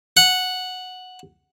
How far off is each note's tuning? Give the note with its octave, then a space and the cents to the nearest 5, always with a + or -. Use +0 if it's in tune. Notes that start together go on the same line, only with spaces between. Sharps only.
F#5 -5